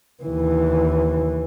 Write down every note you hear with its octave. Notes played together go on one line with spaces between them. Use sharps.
D#2 E3